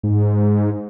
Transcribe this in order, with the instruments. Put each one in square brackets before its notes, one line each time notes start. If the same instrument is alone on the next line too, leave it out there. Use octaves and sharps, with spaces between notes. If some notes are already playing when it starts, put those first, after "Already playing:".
[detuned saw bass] G#2